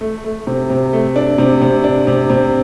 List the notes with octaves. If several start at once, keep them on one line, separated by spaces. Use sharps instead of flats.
A3
A3
C3
C3
A3
D4
C3
C3
D4
C3
C3